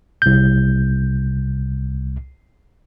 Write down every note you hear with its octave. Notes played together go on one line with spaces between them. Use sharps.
C2 G6